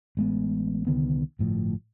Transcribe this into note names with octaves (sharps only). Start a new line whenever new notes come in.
A1 G#3 B3
C2 D3 D#3 B3
G1 A2 F3